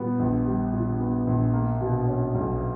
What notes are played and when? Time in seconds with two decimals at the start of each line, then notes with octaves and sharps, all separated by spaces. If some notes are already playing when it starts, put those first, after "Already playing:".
Already playing: A#2 G3 B3
0.19 A#1
0.46 G3
0.73 A#2
1.00 B3
1.27 A#1
1.53 A#3
1.80 B2
2.08 C#4
2.35 B1